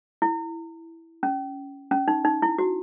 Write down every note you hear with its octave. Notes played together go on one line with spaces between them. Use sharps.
E4
C#4
C#4
D#4
D#4
E4
F#4